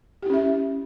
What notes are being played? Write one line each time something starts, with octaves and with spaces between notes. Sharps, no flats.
C#4 E4 G4 E5